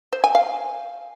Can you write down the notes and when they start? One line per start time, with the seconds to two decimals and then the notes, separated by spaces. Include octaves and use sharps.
0.13 C5
0.24 G#5
0.35 F5